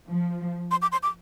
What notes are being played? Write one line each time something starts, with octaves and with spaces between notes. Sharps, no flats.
F3
C6
D6
C6
D6